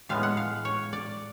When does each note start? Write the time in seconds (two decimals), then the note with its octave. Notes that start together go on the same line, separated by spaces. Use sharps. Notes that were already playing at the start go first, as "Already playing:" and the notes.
0.09 A2 G#3 B3 F5
0.23 F#5
0.37 F5
0.65 C#5
0.93 D5